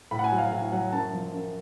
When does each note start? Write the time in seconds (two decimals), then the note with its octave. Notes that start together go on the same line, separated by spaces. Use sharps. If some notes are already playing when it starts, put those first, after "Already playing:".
0.11 A2 B5
0.19 F#5
0.24 G#5
0.31 F#3
0.38 F5
0.52 A2 F5
0.72 F#3 F#5
0.92 F#2 A5
1.13 F3
1.33 F#2